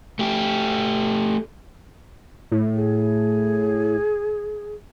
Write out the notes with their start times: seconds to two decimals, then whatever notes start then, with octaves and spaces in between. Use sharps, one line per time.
0.19 A3 G4
2.51 A2
2.74 G#4